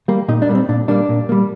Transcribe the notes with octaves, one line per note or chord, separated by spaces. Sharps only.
G3 A#3
A#2 D#4
D4
G3 A#3
C4
A#2 D4
G3 A#3 D4
A#2
G3 A#3